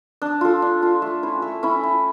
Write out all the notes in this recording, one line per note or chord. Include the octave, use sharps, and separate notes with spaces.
D4
F4 A4
D4
F4 A4
A3
C#4 E4
A3
C#4 E4
E4